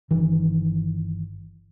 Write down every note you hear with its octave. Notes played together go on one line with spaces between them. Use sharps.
G1 D#3 E3